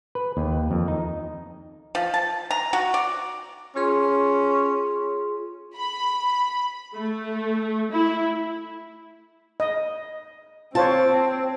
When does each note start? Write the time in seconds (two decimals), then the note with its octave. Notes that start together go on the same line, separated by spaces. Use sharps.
0.15 B4
0.37 D#2
0.71 F2
0.88 D#4
1.95 F3
2.14 A5
2.51 A#5
2.73 F#4
2.94 D5
3.76 C#4 F4 G#4 C6
5.76 B5
6.94 A3
7.91 E4
9.60 D#5
10.75 C4 F4 C5 C#5 A5